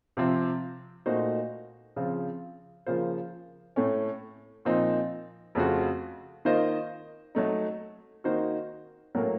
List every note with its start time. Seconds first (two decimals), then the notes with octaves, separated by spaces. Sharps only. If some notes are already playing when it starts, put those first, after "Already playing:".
0.17 C3 F3 C4
1.06 A#2 A3 D#4 F#4 C5
1.96 C#3 F3 C4 F4
2.86 C#3 F3 A#3 F4 C5
3.76 A2 A3 C#4
4.65 A#2 F3 C4 D#4
5.55 F2 C#3 A3 C4 F#4
6.45 D#3 A#3 F4 C5 D#5
7.35 F#3 A3 D#4
8.24 D#3 A#3 D#4 F#4 C5
9.15 A2 F#3 A#3 C#4 A4